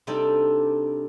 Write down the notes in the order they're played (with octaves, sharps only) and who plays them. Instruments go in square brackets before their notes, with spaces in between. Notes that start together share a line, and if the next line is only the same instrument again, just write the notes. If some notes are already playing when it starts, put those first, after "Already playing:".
[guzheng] C3 G3 D4 D#4 A4